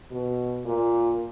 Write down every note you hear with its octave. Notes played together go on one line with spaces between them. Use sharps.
B2
A#2